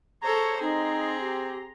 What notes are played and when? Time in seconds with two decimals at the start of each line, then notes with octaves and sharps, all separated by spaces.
0.22 G#4 A4 C5 C#5 A#5
0.61 C4 D#4 G#4 A#5 C6
1.20 G4